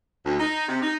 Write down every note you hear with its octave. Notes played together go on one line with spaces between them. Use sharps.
D2
D#4
C3
D#4